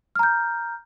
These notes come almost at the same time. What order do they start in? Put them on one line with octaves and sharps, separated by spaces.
F6 A#5 G6